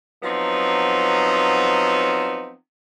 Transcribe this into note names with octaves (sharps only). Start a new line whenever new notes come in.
F3 F#3 B3 C4 D#4